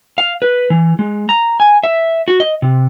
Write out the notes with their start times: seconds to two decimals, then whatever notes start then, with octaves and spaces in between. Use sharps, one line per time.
0.18 F5
0.42 B4
0.70 E3
0.99 G#3
1.29 A#5
1.60 G#5
1.83 E5
2.28 F#4
2.40 D#5
2.62 C3